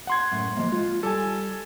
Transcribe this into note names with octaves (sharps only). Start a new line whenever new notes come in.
F#5 C6 G#6
F#2 A2
F3 G#3 A#3
F4
G3 A4 G#5